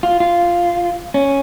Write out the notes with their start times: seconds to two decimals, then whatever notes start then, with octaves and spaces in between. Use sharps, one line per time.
0.03 F4
0.20 F4
1.14 C#4